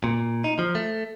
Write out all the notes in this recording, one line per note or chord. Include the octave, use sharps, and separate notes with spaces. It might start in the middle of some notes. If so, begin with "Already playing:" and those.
A#2
D#4
F3
A3